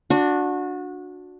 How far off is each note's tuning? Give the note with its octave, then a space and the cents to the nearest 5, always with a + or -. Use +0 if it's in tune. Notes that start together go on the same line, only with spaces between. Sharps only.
D4 +0 F#4 -25